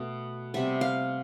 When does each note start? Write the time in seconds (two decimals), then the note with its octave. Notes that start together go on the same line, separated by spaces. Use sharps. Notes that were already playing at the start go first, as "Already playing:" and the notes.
Already playing: B2 A3
0.54 C3 G3 B3 E5
0.81 F5